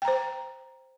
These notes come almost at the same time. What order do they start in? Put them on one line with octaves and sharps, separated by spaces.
G5 A#5 C5